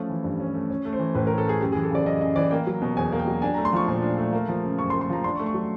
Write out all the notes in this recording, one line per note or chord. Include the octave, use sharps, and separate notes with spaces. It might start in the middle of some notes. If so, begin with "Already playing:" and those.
Already playing: F3 A3 C#4
E3
G2
C#4
A3
C#4
A3
C5
E3
A2 B4
C#4 A#4
A4
A3 G#4
F#2 G4
E3 G#4
A4
C#3 D5
F#2 D#5
F#2 D#5
E3 D5
A#3 G5
F#3
B2
E2 G#5
A#3
G5
F#3
D4 G#5
A3 A#5
C6
F3 C#6
A#2
D4
A3
A#3
F3
C#3
F#2 C#6
C6
A#3
C6
F3 A#5
D4 C6
C#6
A3
C#6
F#3